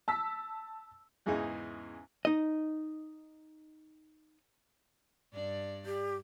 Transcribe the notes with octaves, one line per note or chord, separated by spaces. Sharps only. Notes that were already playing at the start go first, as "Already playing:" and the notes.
A5 E6 B6
E2 G#2 C#3 E3 D#4
D#4 D#5
G2 D4 D5
G4